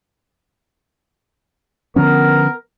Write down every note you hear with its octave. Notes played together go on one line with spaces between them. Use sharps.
D3 F3 B3 C#4 A#4